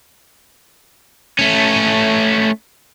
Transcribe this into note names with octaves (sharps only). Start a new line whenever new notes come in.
A3 C#4